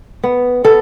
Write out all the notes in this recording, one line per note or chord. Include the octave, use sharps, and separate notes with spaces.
B3
B3 A4